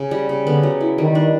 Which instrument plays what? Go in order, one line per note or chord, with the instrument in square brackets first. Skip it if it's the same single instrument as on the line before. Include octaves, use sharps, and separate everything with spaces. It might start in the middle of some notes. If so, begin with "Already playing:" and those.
Already playing: [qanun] C#3
G3
C#3
[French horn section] D3 [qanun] B3
[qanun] F#3
E4
[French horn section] D#3 [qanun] G3
[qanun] D4